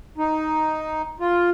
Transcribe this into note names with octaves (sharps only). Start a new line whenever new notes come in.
D#4
F4